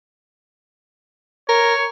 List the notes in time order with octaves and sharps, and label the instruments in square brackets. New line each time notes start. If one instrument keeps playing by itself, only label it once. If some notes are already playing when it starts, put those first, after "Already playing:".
[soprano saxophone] A#4 [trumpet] C#5